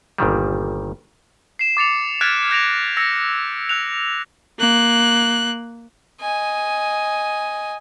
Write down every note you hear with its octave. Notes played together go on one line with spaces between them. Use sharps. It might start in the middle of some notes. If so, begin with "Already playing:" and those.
G1 A#2 D#3 G3
C7 E7
D6 A6 C#7 F7
F6 F#6 G#6 A6 B6 D7
F6 G6 A#6 D7 F7
E6 A#6 C#7
E6 F#6 F7
A#3 F#6
D#5 G#5